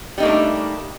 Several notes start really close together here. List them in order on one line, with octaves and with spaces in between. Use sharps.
G3 D#4 A#3 A3 D4